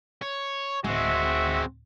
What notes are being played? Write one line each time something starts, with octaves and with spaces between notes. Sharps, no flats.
C#5
D1 G#3 C4 F#4 E5